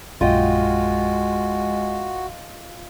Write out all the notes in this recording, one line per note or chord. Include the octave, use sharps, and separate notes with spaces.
A#1 F#2 G#3 F4 F#4 D#5 G5